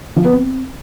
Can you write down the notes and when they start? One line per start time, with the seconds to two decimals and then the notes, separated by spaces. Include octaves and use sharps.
0.16 F3
0.25 B3
0.33 C4